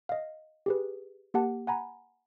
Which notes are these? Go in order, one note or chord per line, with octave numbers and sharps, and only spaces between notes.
D#5 F5
G4 G#4 B4
A#3 G4 F#5 A5
F#5 G#5 A#5 B5